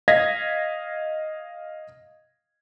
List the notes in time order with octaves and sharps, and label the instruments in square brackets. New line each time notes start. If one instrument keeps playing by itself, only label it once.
[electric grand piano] D#5 F5 G#6 A#6 B6